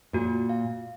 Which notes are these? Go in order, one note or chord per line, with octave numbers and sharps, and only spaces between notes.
A#2 F#4
F5